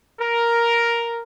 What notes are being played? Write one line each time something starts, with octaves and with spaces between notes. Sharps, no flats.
A#4